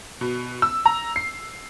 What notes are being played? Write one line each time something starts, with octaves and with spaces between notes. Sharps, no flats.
B2
E6
A#5
C7